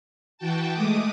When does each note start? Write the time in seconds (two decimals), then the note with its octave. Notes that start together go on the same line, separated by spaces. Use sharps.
0.38 E3 F#4 G5 A5
0.73 G#3 A3 D6 D#6